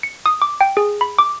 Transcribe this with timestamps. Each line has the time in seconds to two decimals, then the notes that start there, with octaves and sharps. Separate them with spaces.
0.03 C#7
0.26 D#6
0.42 D6
0.61 G5
0.77 G#4
1.01 B5
1.19 D6